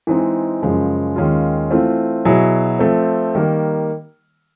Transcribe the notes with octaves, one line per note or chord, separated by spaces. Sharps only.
E3 G#3 C4 D#4 G#4
F#2 C#3 F3 G#3
D#2 D#3 G#3 C#4 F4
E3 A3 C4 F4
B2 F#3 B3 E4 G#4
F3 A3 C4
D#3 G3 A#3